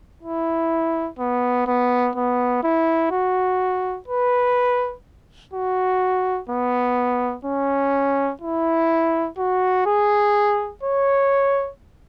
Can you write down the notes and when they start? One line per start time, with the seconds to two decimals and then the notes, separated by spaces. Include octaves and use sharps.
0.23 E4
1.19 B3
1.67 B3
2.16 B3
2.63 E4
3.11 F#4
4.08 B4
5.53 F#4
6.49 B3
7.45 C#4
8.41 E4
9.38 F#4
9.86 G#4
10.83 C#5